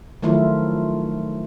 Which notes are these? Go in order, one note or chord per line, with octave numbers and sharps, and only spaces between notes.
D#3 F3 F#3 A3 E4 F4